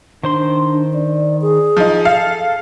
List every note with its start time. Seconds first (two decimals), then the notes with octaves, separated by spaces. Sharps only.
0.23 D#3 D4 C5 C6
0.94 D5
1.42 G#4
1.77 F3 D#4
2.05 A4 F5